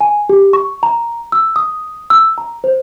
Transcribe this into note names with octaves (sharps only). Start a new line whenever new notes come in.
G#5
G4
C#6
A#5
E6
D#6
E6
A#5
C5